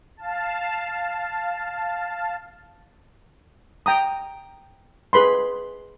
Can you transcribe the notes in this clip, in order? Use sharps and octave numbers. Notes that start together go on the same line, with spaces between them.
F5 A5
G5 A#5 D#6
G#4 B4 B5 C6